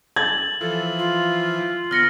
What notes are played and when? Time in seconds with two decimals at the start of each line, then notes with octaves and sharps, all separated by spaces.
0.16 G#6 A6 F#7
0.61 E3 F3 A4
0.99 F4
1.91 D3 B3 F6 A#6 C#7